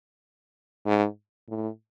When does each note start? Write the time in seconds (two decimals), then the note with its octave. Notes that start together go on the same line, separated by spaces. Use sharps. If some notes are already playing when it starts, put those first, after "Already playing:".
0.86 G#2
1.49 A2